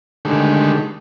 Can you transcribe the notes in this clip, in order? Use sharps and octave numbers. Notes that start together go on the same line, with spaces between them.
D3 D#3 G#3 A3 G4